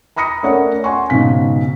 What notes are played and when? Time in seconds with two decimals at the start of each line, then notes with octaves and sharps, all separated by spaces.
0.16 A#5 B5 D#6 A#6 C#7
0.43 A3 C#4 A#4 C#5 D5 F#5
0.84 F#5 G#5 C6 C#6
1.10 B1 G#2 C#3 B6